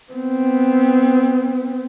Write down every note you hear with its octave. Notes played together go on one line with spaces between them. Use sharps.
B3 C4